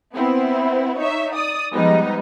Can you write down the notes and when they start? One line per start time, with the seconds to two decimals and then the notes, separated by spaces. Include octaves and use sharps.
0.13 B3 C4 E4
0.98 D#4 C#5 E5
1.33 D5 D#6
1.74 F3 G3 G#3 B3 D#4